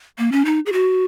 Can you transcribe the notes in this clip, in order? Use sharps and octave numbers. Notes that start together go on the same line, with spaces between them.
A#3
C#4
D#4
G#4
F#4